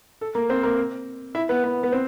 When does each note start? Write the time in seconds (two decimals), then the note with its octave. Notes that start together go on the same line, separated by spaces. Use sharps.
0.21 A4
0.35 A#3 A#4
0.50 C4 C5
0.63 A#3 A#4
1.35 E4 E5
1.49 B3 B4
1.64 B3 B4
1.83 B3 B4
1.92 C4 C5